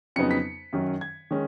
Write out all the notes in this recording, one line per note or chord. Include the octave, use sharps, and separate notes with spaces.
F2 C#3 F#3 B3 D#4 C#7
B6
F#2 D#3 F#3 C#4
G#6
D#3 G#3 C#4